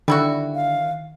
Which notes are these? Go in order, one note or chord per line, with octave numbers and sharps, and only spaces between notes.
D3 D#3 G3 E4 F#4
F5